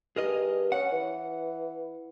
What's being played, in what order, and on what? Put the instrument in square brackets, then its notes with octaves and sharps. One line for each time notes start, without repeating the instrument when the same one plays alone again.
[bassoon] G2 [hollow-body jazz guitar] G#4 A#4 D#5
[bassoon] C#4 [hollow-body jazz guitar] F#5
[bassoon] E3